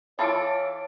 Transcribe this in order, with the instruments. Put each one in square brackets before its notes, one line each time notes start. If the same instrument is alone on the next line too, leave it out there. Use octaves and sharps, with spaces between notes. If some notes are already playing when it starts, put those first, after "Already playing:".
[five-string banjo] E3 F4 A4 [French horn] C#5 [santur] A5 D6